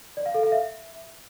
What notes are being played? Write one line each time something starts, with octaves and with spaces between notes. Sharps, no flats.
D5
F5
A4
F5
E5